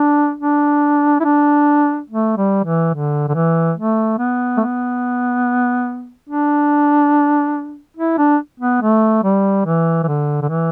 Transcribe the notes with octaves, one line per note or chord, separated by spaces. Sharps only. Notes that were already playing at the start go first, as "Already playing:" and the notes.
Already playing: D4
D4
E4
D4
A3
G3
E3
D3
D3
E3
A3
B3
A3
B3
D4
E4
D4
B3
A3
G3
E3
E3
D3
D3
E3